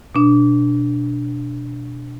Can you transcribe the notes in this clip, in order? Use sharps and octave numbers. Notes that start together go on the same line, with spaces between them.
B2 D4